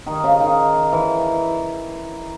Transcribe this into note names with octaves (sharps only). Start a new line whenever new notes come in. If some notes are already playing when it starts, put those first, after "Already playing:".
D#3
C#3
D#3
E3